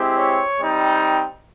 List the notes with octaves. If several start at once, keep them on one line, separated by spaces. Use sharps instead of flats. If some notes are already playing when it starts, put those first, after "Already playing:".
Already playing: G#3 C4 E4 G4
C#5
G3 C4 D#4